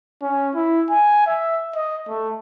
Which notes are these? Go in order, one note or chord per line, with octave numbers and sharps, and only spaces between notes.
C#4
E4
G#5
E5
D#5
A3